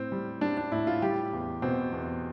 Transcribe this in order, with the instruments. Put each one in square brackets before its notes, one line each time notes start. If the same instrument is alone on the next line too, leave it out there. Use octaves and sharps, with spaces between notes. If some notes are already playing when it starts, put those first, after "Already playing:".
Already playing: [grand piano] A2 C4
G3
G3 D4
D4
A2 E4
F4
G3 G4
E2
B2 C4
E2